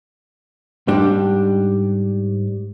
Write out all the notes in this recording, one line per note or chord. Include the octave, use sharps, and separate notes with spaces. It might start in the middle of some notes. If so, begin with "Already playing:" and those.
G#2 G3 D4 G4